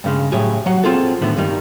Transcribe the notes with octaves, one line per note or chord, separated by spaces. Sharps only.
G2 C#3 G#3
A2 F#3 G4 G#4
F#3 F#5
C4 F4 G#4 A4
A2 D3 D#3 B3
G2 D#3 G3 D#4